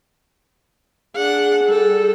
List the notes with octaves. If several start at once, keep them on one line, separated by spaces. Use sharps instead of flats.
D4 G#4 F#5
G3 A4